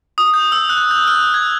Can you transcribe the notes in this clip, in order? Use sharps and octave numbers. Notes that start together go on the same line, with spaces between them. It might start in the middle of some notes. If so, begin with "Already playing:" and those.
D#6
G6
E6
F#6
G6
F6
G#6